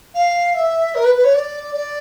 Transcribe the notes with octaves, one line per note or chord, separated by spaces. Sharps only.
F5
E5
A#4
B4
B4
C#5
D5
D5